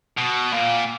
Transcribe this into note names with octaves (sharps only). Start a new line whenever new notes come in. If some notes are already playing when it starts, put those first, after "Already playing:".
B2
A#2